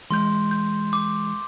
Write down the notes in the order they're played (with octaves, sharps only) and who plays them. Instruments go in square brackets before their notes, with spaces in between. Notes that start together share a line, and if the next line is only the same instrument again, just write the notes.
[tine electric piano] E3 G#3 [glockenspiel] C6 G6
[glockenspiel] G6
D6